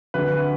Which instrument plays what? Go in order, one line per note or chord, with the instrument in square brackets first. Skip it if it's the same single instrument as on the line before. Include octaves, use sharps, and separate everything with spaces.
[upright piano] D2 D3 B4